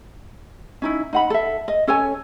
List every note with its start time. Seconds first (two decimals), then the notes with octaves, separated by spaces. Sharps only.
0.82 C#4 D#4 E4
1.13 D#4 F#5 B5
1.30 A4 E5
1.68 D#5
1.87 C#4 A4 C#5 G#5